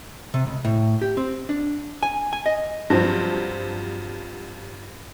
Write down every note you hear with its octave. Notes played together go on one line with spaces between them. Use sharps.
C3
C#2
A2
G4
C4
D4
G#5
G#5
D#5
G2 F3 F#3 C4